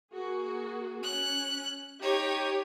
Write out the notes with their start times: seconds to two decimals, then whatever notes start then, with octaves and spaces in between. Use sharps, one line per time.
0.13 A#3 F#4 G#4
1.03 C#4 F#6
2.02 D#4 G4 C#5